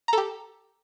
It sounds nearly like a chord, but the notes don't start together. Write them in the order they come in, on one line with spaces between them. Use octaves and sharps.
A#5 A4 G4